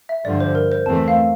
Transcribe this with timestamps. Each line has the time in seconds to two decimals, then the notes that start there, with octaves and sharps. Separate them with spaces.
0.09 E5
0.24 G2 D3 F3 D5
0.40 C5
0.55 A#4
0.72 C5
0.86 E2 E3 A3 C4 A5
1.08 F5